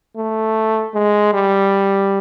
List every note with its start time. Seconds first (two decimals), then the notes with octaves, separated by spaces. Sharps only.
0.17 A3
0.95 G#3
1.34 G3